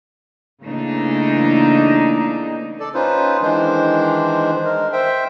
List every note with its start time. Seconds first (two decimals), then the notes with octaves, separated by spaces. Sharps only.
0.63 C#3 E3 A3 A#3 D4 D#4
2.80 A4 D5
2.94 C#4 D#4 F4 B4 C5
3.42 D#3 E3 G#3 D4 C5
4.64 G#3 A#4
4.92 C5 E5 G5